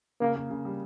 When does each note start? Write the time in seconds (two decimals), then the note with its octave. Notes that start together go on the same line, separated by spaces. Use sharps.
0.20 C#3 A#3
0.36 A#3
0.51 C#3
0.65 G3